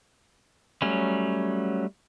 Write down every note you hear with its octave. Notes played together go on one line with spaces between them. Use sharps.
F#3 G3 A3 C#4